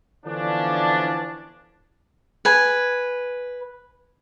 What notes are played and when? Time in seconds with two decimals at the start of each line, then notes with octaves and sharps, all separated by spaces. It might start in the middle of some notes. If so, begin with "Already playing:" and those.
0.25 D3 E3 F3 B3 C#4 D4
2.45 B4 G#5